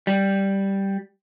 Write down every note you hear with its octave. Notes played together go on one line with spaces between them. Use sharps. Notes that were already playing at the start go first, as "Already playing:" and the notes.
G3